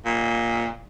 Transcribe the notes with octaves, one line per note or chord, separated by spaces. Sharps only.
A#2